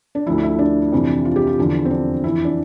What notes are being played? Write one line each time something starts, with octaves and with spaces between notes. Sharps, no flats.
D4
D2 D3 F3 E4
E4
D4
F2 C3 E3
F4
G4
F4
E2 D3 F3
C4
D4
F2 E3 E4
D4